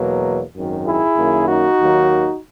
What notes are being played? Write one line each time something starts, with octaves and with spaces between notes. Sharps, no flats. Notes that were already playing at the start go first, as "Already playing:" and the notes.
Already playing: E2 B2 F#3 A#3
G#1 F#2 D#3
E4 G#4
F#2 D#3 A#3
D#4 F#4
D#2 D#3 F#3 A#3